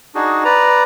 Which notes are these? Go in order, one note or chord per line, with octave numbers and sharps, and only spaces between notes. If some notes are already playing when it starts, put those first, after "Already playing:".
D4 D#4 F#4 G#4
B4 D5 A#5